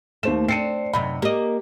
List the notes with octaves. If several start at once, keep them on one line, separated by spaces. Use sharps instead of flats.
D#2 A3 C5 E7
C4 D4 C7 C#7 D#7
F#2 C3 D#4 B5
A#3 G4 D#5